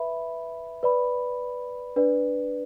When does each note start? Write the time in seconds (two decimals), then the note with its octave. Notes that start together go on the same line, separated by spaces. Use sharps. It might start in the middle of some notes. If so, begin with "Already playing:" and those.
Already playing: B4 E5 B5
0.83 B4 D5 B5
1.96 D4 B4 D5